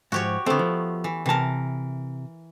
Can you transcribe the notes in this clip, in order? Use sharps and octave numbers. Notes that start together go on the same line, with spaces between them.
G#2 F3 F#4 G4 C#5
D3 A3 B3 C4
F3
E3
C3 E3 A#4 A5